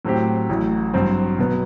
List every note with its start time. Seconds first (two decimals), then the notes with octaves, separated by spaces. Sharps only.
0.05 A2 F#3 C4 G4
0.49 A1 A2 F#3
0.94 G2 F#3 C4
1.38 B2 F#3 B3